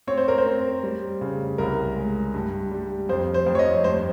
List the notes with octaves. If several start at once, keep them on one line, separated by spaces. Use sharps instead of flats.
C4 C#5
C5
A#4
C5
C4
G3
C#3
C2 A#4
G#3
G2
G3
F2 C5
C5
F2
C#5
D#5
G2 C5